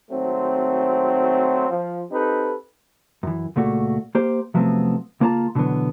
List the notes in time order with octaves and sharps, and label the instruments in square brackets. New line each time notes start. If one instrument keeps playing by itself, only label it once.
[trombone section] G#1 F#3 A3 C4
F3
C4 D#4 G4 A4 B4
[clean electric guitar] F#2 E3
C#2 A#2 A3 F#4
A#3 G4 C5
C3 F3 F#3 A3 B3 C4
C#2 A#3 B3 F4 A5 A#5
B2 D3 E3 F#3 B3